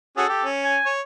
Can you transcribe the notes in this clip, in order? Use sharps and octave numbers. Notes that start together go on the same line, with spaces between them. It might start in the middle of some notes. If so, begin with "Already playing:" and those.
C#4 F#4 G#4 A4
G4
C#4
G#5
C#5